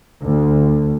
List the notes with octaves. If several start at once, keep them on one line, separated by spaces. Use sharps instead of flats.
D2